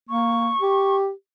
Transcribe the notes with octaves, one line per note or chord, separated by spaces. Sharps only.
A#3 C#6
G4